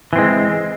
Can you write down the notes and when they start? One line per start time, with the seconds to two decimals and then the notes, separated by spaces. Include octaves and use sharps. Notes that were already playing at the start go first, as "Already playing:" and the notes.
0.13 E3
0.16 C4
0.18 G#3